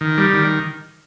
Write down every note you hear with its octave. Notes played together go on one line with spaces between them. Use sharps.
D#3
G3
D#3